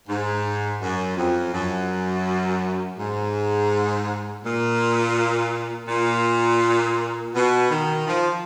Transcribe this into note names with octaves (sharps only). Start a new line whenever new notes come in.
G#2
F#2
F2
F#2
G#2
A#2
A#2
B2
D#3
F3